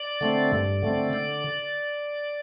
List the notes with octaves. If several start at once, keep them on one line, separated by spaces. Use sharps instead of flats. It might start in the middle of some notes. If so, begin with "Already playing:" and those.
Already playing: D5
D3 A3 C4
G2
D3 A3 C4
D3